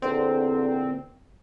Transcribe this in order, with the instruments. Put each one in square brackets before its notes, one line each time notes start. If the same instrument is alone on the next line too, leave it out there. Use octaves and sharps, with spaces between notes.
[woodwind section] E2 A#2 D3 [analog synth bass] C4